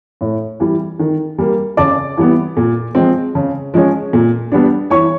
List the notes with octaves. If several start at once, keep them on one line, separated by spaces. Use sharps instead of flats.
A2
E3 G3
D#3
G3 A#3
C#3 D5 D6
E3 G3 B3
A#2
F3 G#3 C4
C#3
F3 G#3 C#4
A#2
G3 B3 D4
E3 C#5 C#6